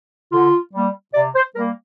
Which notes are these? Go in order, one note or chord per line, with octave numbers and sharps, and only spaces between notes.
D3 F4
G3 A#3
C3 D5
C5
G3 A#3 A#4